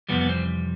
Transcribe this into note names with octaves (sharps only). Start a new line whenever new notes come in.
F2 C3 E3 G3 B3
B3
C4